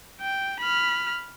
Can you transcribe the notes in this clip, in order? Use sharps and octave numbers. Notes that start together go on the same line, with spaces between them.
G5
B5 F6